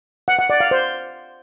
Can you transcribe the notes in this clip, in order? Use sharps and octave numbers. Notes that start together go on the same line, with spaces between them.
F#5
F#5
D5
F5
C5